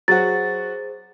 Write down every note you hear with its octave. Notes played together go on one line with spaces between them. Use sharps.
F#3 F#4 G#4 C5 A6